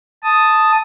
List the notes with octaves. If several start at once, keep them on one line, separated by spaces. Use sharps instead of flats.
A5 D#6